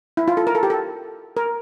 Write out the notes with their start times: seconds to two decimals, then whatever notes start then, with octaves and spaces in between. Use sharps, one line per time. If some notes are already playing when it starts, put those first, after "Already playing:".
0.17 E4
0.28 F4
0.37 A4
0.47 A#4
0.55 A4
0.63 G4
0.70 A4
1.37 A#4